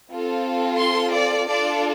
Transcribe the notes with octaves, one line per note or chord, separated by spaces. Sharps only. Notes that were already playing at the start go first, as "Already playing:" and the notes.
C4 F4 A4
C6
D5
D4 F4 A4 D5